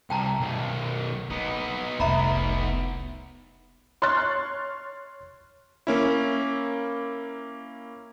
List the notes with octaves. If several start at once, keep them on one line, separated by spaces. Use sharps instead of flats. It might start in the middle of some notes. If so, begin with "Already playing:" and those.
C2 G5 A5 A#5
B1 D#3
A#3 B3 D#4
F1 C2 E5 A#5 B5
C#5 C6 C#6 F6 F#6 A6
A#3 C#4 E4